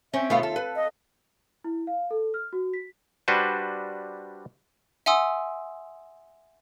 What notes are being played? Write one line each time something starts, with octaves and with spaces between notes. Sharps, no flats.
C4 C#4 E5
D#2 B2 A3 B3 F4 F5
A4
B4
D#5
E4
F5
A4
F6
F#4
B6
G3 D4 F#4 B4 C5
E5 F#5 G#5 C6 D#6 E6